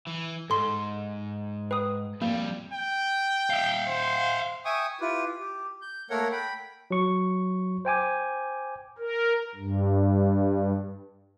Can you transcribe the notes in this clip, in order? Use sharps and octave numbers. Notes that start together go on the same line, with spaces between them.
E3
G#2 A4 C6
B4 G5 D#6
F2 G3 A#3
G5
E5 F5
C5
E5 G5 G#5 C#6 D#6
E4 F4 G4 B4
G4
G6
A3 A#3 A#4 C#5 F#5
G5 B5
F#3 C#6
C5 G5 G#5 D6
A#4
G2